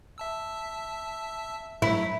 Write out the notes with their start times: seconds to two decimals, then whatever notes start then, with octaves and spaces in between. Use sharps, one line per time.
0.18 E5 A5 E6
1.82 G2 F#3 A3 E4